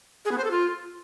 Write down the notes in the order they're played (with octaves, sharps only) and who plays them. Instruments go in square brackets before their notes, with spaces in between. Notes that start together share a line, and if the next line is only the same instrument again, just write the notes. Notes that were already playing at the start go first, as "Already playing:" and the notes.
[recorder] G#4
B3
C5
A4
F4